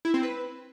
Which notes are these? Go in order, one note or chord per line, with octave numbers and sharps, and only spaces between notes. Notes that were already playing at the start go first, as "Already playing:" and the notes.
E4
C4
B4